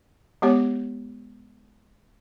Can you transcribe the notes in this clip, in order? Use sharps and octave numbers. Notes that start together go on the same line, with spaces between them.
G#3 B3 G4 C#5